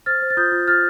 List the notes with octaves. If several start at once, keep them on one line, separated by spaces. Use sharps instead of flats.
C5 F6 A6
C5
A6
F4 D#6 G6
F4
F4 F6 A6